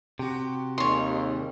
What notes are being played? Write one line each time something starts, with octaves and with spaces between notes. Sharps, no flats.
C3 F#4 G4
D#2 D#3 G3 G#3 C#5 C6